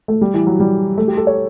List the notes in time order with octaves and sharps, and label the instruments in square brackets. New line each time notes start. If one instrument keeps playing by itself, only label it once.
[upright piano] A3
G3
E3
F#3
G3
A3
G4
A4
C#5